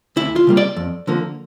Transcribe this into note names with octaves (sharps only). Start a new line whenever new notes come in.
D2 E4
F4
C#3 G3 A#3
D5
F2
D3 F3 A#3